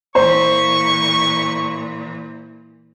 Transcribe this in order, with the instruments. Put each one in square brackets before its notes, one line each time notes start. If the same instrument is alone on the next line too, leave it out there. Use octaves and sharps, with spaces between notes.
[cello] A#2 E3 [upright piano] C5 [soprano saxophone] C#6